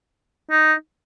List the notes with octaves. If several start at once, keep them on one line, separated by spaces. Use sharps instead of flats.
D#4